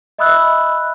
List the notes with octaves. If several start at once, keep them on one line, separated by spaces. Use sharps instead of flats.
D#5 E5 B5 D#6 E6 F#6